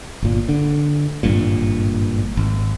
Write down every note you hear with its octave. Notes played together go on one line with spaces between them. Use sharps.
G1 A#2
D3
G#1 G2 A#2
G#1